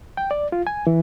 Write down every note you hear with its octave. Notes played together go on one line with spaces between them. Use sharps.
G5
D5
F4
G#5
E3